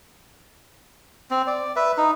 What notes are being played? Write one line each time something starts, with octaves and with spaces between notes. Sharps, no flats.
C4
D5
B4 E5
D#4